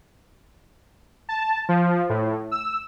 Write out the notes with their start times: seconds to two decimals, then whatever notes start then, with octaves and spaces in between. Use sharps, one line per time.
1.29 A5
1.69 F3
2.09 A2
2.52 E6